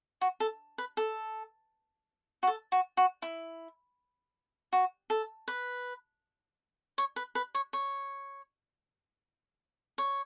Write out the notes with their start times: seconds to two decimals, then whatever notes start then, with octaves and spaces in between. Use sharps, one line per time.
0.21 F#4
0.40 A4
0.78 B4
0.97 A4
2.43 F#4
2.47 A4
2.72 F#4
2.97 F#4
3.22 E4
4.73 F#4
5.10 A4
5.48 B4
6.98 C#5
7.16 B4
7.35 B4
7.55 C#5
7.73 C#5
9.98 C#5